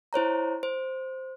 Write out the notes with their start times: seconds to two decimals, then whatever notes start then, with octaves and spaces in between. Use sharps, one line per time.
0.13 E4 C5 C#5 A#5
0.63 C5